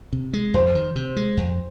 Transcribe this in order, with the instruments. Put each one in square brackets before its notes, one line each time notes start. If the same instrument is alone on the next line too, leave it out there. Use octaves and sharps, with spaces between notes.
[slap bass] C3
G#3
[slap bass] F2 [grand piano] C5
[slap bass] D#3
C3
G#3
F2